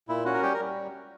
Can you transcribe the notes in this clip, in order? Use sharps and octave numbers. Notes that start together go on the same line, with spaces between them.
A#2 E4
C#4 F#4
A#4
G3 G4
A#4
G3